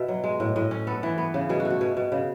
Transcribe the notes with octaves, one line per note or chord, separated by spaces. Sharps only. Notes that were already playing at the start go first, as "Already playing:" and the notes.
Already playing: B2 E5
F#3
G#3
A2
A2 D#5
C#4
B3 A4
E3
B3
C#3
B2 G#4
F#4
A3
F#4
B2 G#4
B2
C#3